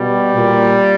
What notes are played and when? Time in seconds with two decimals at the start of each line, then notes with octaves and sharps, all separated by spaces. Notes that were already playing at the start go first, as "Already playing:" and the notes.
Already playing: B2 G3
0.35 A#2